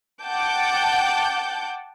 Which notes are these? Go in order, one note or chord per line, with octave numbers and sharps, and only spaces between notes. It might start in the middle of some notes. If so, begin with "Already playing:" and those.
F#5 G5 A5 D6 G6